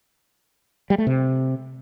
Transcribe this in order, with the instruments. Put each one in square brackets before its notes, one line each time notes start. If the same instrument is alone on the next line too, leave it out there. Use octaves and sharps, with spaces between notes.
[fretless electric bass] G3
A3
C3